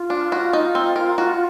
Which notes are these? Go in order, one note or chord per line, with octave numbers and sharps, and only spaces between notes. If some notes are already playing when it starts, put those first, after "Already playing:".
Already playing: F4
D4
F#4
D#4
C4
A#4
F#4